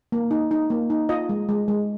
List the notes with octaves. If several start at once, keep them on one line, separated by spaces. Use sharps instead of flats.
A#3
D#4
D#4
A#3
D#4
F4 D#5
G#3
G#3
G#3